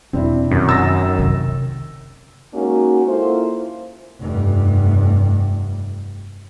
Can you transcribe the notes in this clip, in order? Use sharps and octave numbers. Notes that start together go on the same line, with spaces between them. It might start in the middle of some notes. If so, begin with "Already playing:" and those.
E1 C4 D4 E4
F#2 C3 D#3
E6 A6 A#6
C3
G#3 A#3 C#4 D#4 F#4
A#3 E4 F4 A4 C5
F1 G2